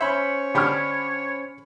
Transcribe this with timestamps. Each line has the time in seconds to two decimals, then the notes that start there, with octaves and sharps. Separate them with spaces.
0.01 C#4 C5 C#5 E5 B5 C#6
0.55 D3 D4 G4 B5 C#6 F6